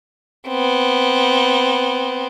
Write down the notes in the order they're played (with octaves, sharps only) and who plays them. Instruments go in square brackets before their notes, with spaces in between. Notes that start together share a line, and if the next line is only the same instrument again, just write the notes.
[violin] B3 C4